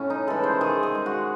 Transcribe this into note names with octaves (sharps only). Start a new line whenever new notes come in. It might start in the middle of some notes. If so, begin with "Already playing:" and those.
Already playing: A2 C#4
D#4
E3 G#3 A4
C5
D#3 G#4
G#4
G#3
F#4